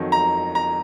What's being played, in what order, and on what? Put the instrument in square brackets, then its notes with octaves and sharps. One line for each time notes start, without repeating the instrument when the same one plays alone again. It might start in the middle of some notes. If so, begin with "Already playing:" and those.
Already playing: [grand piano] F2 D#3 F#3
A#5
A#5